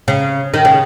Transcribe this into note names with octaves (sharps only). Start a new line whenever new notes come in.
C#3
D#3
C#3